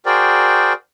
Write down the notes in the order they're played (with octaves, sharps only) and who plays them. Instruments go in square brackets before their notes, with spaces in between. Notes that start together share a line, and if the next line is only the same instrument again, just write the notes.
[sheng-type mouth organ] F#4 G#4 A#4 C5 D5 G5